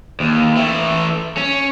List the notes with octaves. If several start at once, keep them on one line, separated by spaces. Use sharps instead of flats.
D#2
E3 A3
C#4